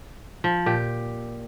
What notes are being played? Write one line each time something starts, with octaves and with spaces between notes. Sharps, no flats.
F3
A#2 G4